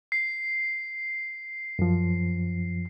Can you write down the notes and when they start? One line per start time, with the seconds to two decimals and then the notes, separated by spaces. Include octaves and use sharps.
0.12 C7
1.79 F#2 F3